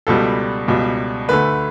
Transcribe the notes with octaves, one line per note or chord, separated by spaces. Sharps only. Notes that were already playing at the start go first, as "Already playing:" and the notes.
C#2 B2 G3 A4
C#2 B2 G3
D2 D3 A3 B4